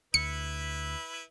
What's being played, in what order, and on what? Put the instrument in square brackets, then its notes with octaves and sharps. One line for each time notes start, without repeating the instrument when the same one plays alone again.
[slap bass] D2 [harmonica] E4 B4 [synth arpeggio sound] C#7